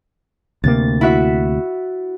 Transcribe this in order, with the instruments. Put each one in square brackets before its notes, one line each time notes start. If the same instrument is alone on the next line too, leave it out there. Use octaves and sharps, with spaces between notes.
[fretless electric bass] D2 C3 A#3 [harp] A6
[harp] E4 F#4 E5